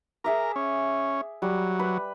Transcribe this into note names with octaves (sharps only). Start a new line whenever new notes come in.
G#4 A#4 E5 D6
C#4
F#3 G3
B4